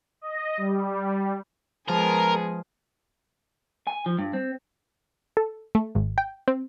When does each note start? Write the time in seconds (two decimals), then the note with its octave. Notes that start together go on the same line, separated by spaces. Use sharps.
0.21 D#5
0.57 G3
1.89 F3 G#3 B3 G#4 A#4
3.87 G#5
4.06 F3
4.19 G2
4.33 C4
5.37 A4
5.75 A3
5.95 G#1
6.18 G5
6.48 C4